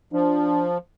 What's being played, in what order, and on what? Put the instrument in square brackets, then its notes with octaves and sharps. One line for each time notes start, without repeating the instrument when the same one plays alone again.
[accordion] F3 [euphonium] D4